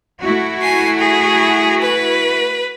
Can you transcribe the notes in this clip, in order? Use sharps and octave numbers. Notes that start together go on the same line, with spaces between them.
A3 E4 F#4
G#5 C7
G#4
B4